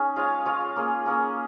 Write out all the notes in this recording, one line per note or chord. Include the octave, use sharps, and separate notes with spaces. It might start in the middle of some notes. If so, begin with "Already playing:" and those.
Already playing: C#4 D#4 G#4
G#3 F4 C#5 F5
G#3 F4 C#5 F5
A#3 C#4 G#4
A#3 C#4 G#4